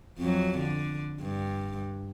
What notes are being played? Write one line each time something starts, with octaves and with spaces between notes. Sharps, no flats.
F2 F#3
D3
G2